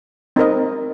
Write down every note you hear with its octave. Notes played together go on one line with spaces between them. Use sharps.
C4 D#4 A#4 D#5